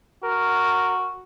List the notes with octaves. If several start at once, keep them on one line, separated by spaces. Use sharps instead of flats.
F#4 A#4